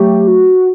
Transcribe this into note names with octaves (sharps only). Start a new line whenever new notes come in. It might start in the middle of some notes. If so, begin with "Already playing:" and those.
Already playing: F#3 A3 G4
F#4